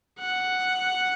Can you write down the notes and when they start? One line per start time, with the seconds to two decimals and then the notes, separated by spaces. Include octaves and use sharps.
0.20 F#5